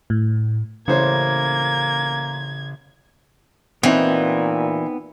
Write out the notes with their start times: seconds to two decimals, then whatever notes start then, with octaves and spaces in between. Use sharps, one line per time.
0.10 A2
0.88 A1 C#3 A#3 C5 C#5 G#6
3.83 A#2 E3 B3 C4 D#4